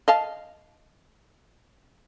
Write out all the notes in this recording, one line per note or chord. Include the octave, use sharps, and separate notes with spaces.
D#5 F5 A5